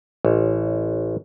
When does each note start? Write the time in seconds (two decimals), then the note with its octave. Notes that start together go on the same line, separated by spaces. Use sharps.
0.25 A1